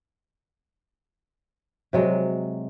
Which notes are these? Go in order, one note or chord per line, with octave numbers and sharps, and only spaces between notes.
C3 F#3 G#3